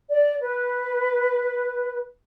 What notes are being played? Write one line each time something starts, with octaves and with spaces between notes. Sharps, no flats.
D5
B4